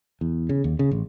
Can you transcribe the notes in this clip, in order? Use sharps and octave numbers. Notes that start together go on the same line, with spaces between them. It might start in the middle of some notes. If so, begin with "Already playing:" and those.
E2
C#3
D#2
C#3
A1